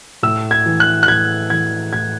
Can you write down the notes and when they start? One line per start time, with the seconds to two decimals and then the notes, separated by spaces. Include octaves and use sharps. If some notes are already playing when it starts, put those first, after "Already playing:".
0.23 A2 E6
0.51 G#6
0.66 E3
0.80 F#6
1.03 F#6
1.07 A2 G#6
1.50 E3 G#6
1.93 A2 G#6